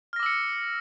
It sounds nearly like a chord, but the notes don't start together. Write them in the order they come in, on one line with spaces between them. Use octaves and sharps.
F6 A#6 D6 E6 C#7